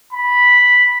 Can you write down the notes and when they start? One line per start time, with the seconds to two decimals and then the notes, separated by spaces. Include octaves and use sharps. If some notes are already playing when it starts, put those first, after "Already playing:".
0.13 B5